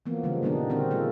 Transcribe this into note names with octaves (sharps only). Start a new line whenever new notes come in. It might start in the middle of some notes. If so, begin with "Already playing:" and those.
E3 F3 A#3 B3
C#3 F3 G3 G#3
A#2 D#3 G3 B3 D4 D#4
D3 C4 F#4 A#4
G#3 A#3 F4 A4